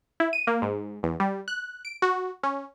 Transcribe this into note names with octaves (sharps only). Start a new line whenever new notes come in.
E4
D#7
A#3
G#2
E2
G3
F#6
D7
F#4
C#4